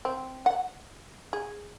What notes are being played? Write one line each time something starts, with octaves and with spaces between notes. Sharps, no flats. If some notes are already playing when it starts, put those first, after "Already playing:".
C4
F#5
G#4